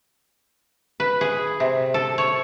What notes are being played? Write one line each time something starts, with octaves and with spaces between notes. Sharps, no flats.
B4
G#4
C3
A4
C#5